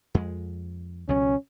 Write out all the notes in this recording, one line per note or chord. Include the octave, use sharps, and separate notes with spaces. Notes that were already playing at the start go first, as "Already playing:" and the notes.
F2 G#3
C#2 B2 F#3 C#4